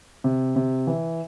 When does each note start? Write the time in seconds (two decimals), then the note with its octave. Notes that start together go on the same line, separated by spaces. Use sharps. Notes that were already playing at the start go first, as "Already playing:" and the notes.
0.24 C3
0.56 C3
0.87 E3